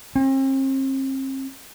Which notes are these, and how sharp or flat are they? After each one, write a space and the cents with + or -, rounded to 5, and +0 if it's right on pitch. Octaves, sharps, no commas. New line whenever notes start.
C4 +40